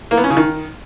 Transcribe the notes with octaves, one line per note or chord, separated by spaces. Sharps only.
A#3
B3
C#4
C#3
D#3